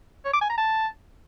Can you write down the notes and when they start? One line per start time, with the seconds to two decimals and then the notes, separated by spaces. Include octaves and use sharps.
0.25 C#5
0.33 D6
0.41 G#5
0.49 A#5
0.57 A5